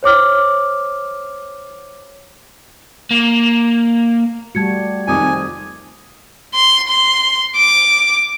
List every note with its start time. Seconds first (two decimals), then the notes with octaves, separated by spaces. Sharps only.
0.03 C5 C#5 D6 F6
3.11 A#3
4.55 G3 A3 F#4 A5 G#6 C#7
5.07 F2 C3 D#3 F4 G#5 D6 D#6
6.54 C6
6.88 C6
7.56 D6